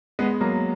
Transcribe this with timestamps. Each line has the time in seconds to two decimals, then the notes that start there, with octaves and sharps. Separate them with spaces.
0.19 G#3 B3
0.41 F#3 A#3